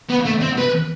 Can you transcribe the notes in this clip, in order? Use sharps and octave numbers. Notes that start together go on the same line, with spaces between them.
B3
A3
C4
B4